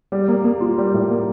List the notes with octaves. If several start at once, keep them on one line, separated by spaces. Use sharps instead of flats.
G3
A#3
A#3
F4
G3
A2
A#3